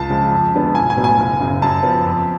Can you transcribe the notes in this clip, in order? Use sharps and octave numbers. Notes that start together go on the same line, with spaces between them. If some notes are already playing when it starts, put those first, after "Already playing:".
Already playing: C#2 A5
C#3 F3 G#3
F2
D3 G#3 B3
B1 G#5
G#5
A2 F#3 B3
G#5
F#1
F#2 C#3
F#2 A5
F3 B3
F2